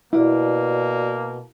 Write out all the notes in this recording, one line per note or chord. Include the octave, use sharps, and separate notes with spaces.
B2 A#3 E4 F#4 G4 D5